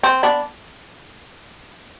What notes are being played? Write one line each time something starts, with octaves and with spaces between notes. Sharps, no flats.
C4
B3 D4